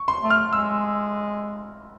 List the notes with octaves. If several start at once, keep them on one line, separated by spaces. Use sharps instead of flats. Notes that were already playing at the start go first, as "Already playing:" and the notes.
Already playing: C#6
C6
A3
F6
G#3 E6